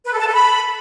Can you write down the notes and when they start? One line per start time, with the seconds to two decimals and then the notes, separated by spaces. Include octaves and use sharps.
0.06 B4
0.13 A4
0.20 A5
0.27 A4
0.33 B5